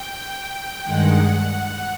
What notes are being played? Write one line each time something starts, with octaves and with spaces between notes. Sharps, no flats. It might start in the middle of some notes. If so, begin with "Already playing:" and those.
Already playing: G5
G2 D#3 G#3 F#5